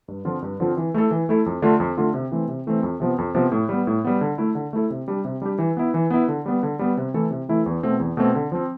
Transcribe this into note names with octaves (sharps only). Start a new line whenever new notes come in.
G2
D3 F3 C4 F4
G2
D3 F3 C4 F4
E3
A3 E4 A4
E3
A3 E4 A4
F2
D3 A3 D4 F4
F2
D3 A3 D4 F4
C3
E3 A3 C4
C3
E3 A3 C4
F2
C3 F3 B3
F2
C3 F3 B3
A2
G3 B3
A2
G3 B3
D3
A3 E4 A4
D3
A3 E4 A4
C3
G3 D4 G4
C3
G3 D4 G4
E3
B3 E4
E3
B3 E4
D3
G3 B3
D3
G3 B3
C3
E3 A3 E4 A4
C3
E3 A3 E4 A4
E2
B2 A3 C4
E2
B2 A3 C4
D3
F3 C4